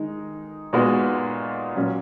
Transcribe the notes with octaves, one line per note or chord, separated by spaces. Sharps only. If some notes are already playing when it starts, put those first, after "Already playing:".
Already playing: D#3 G#3 D#4
A#2 G#3 B3 D#4 F#4
A#2 F#3 C#4